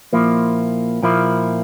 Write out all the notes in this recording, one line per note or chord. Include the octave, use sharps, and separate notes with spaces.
A#2 F3 A#3 E4
A#2 F3 A#3 E4